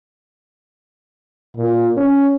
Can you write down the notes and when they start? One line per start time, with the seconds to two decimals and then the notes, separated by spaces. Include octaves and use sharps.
1.57 A#2
1.97 C#4